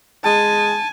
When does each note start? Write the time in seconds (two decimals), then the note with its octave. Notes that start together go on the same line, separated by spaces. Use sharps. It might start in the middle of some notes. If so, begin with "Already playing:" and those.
0.24 G#3 G#5 A5